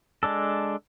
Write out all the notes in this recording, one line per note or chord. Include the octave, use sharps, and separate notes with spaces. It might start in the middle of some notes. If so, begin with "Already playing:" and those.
G#3 D4 A4